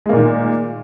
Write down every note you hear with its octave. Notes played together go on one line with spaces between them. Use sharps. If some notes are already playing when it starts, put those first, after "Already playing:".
A#2 D#3 G#3 A#3